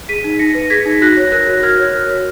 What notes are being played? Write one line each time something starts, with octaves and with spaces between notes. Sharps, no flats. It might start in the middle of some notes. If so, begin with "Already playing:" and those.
G#4 B6 D#7
D#4
D#4 A#6 C#7
B4
A#6
G#4 G#6 B6
D#4
F#4 F#6 A#6
C#5
A#4 F#6 A#6
F#4
F#4 F6 G#6
C#5
A#4
F#4